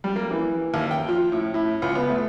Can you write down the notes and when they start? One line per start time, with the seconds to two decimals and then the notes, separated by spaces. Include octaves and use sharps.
0.04 G3
0.16 A#3
0.31 E3
0.74 D#2
0.91 G5
1.08 F3
1.32 A2
1.54 A2
1.82 C#2
1.95 B3
2.09 A3